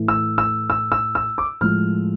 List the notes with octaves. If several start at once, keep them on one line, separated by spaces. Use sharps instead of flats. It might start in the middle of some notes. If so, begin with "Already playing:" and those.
Already playing: A2 E3 A3
E6
E6
E6
E6
E6
D6
A2 F3 G#3 F6